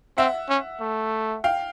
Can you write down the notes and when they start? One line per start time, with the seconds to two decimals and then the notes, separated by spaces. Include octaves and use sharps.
0.18 C4 E5 F#5
0.49 C#4
0.81 A3
1.44 F5 G5